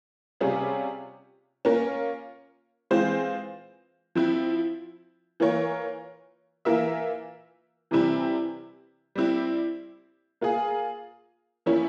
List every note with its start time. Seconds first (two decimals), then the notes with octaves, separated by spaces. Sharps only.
0.41 C3 G3 C#4 F4 G#4
1.65 A#3 C#4 F4 A#4
2.91 E3 G#3 C4 F4 C5
4.15 F3 C4 E4
5.40 E3 A#3 F4 A#4 C#5
6.65 E3 A#3 F4 A#4 E5
7.91 C3 E3 G3 C4 E4
9.15 G3 C4 E4
10.41 A#3 F4 G#4
11.66 F3 A#3 C#4 E4